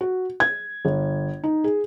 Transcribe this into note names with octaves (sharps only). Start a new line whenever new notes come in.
F#4
G#6
G1
D#4
G#4